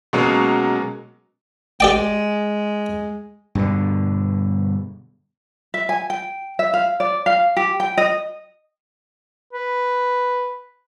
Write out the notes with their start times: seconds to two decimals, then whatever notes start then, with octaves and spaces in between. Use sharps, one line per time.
0.13 B2 F#3 G#3 A#3 C#4
1.80 G#3 G4 D5 G5
3.55 G2 B2 D3
5.74 E5
5.89 G#5
6.10 G5
6.59 E5
6.74 F5
7.00 D5
7.26 F5
7.57 G4
7.80 G5
7.97 D#5
9.53 B4